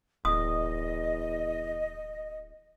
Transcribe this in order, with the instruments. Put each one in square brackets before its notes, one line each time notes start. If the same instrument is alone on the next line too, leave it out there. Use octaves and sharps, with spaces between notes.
[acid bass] D1 [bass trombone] E2 [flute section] D#5 [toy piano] D#6